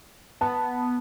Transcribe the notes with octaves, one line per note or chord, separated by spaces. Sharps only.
B3 A5